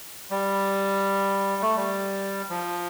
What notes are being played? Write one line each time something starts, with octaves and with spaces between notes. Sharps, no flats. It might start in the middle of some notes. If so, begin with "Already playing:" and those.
G3
A3
G3
F3